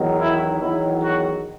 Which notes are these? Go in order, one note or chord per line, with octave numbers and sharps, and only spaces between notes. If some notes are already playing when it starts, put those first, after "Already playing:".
Already playing: E2 D#3 F#3
E4
E2 D#3 F#3 E4
F#4